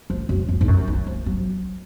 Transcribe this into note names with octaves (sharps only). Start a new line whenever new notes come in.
F3
F#2
F2
G#2
F#2
D#3
F3
F#3